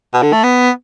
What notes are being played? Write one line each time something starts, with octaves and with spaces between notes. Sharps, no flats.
B2
D3
A3
B3